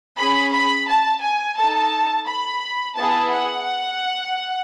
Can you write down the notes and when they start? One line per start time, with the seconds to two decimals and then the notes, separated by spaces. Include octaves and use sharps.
0.17 C#4 G#4 B5
0.52 B5
0.87 A5
1.22 G#5
1.57 D#4 A4 A5
2.27 B5
2.96 B3 E4 G#4 A5
3.31 F#5